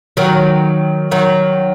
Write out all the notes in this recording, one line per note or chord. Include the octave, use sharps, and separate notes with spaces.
D#3 F#3
D#3 F#3